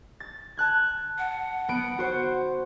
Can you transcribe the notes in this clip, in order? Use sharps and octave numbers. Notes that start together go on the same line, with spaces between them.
A6
A5 F#6 G#6
F#5
B3 D7
F#4 C5